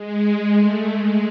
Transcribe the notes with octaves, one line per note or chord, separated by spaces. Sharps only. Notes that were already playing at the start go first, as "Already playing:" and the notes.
Already playing: G#3
A3
G#3